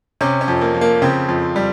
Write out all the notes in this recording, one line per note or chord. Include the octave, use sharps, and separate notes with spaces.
C3 C#4
C#4
F2
A#3
F3
A#3
C#3 C4
F2
G3